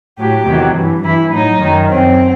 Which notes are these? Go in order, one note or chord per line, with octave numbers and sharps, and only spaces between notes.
A2 F#3 G4
E2 C3 D#3 F#3
G2 E3
G2 E3 E4
A2 F#3 D#4
F#2 D#3 F#3
F#2 F#3 C4